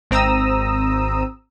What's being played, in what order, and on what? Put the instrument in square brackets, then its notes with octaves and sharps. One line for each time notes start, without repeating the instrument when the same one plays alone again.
[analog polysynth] G#1 C4 A#5 D#6 E6